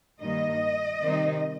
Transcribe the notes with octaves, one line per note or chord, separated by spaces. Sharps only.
G2 D#3 A#3 D#4 D#5
C3 D#3 G3 C4 D#4